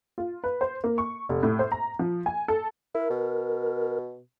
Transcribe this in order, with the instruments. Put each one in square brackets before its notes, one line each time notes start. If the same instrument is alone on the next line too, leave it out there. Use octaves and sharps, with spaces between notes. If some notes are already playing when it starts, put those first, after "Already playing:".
[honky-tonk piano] F4
B4
C5
A#3
C#6
F1
A2
C5
A#5
F3
G#5
A4
[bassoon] E4 [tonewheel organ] A#4
[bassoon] B2